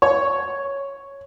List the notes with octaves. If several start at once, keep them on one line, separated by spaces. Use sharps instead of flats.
C#5